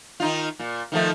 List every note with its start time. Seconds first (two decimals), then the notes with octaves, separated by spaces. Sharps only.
0.20 D#3 D#4 F4
0.59 A#2
0.92 D#3 F3 A3